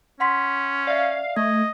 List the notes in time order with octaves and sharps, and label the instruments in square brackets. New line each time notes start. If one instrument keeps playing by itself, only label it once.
[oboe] C#4 [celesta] F#5 C6 B6
[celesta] D5 E5 [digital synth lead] F5
[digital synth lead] A3 [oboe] D#5 [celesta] G#6